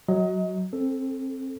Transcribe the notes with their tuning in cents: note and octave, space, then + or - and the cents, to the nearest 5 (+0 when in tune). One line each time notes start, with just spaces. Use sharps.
F#3 +0 D#5 +30
C4 +20 A4 +0